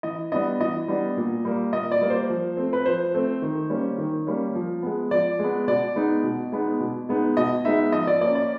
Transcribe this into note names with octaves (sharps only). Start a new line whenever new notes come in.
E3 D#5
G3 B3 D4 D#5
E3 D#5
G3 B3 D4
A#2
G3 A#3
A#2 D#5
D5
G3 A#3
C5
F3
A3 C4
B4
F3 C5
A3 C4
D#3
G3 A#3 C#4
D#3
G3 A#3 C#4
F3
G#3 B3
F3 D5
G#3 B3
B2 D5
G#3 B3 D#4
B2
G#3 B3 D#4
B2
G#3 B3 D#4
B2 D#5
G#3 B3 D#4 E5
F3 D#5
D5
A#3 C#4 D5
D5